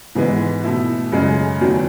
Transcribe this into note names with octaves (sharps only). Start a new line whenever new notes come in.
G#2 E3 G#3 B3
B2 A3 E4
F#2 C#3 G#3
E2 D#3 F#3 A3